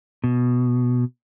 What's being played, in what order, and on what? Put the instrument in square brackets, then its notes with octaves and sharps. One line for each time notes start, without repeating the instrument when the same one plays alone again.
[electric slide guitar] B2